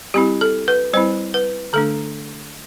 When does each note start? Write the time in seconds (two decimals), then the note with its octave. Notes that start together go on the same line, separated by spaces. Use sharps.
0.14 G3 C4 E4 G4
0.41 A4
0.68 B4
0.93 G3 C4 E4 C5
1.34 B4
1.73 D3 A3 D4 A4